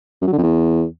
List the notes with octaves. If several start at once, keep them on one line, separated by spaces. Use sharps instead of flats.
F#2
F#3
D3
F2
E2